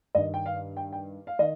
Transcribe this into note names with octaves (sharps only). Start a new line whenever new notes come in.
G2 D#3 D#5
G5
F5
G5
G5
F5
D#3 D#5